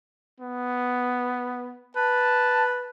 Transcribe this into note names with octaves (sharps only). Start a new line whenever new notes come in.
B3
B4 A5